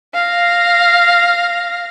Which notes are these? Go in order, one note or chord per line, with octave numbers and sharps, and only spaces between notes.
F5 A#6